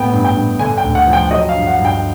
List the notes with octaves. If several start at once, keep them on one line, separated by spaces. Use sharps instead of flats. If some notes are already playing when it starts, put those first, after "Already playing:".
Already playing: A2 B3 G5
G2
G5
G2
D3 G#5
G5
D2
F#5
F3
G5
F#3 D#5
F5
G2
F#5
G2
G5